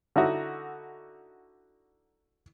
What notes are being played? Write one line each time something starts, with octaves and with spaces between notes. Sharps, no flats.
D3 D#4 E4 F#4